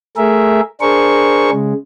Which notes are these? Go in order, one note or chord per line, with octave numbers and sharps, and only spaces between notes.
A3 G#4 A#4 E5
D4 G#4 A#4 C5 C#6
C#3 G#3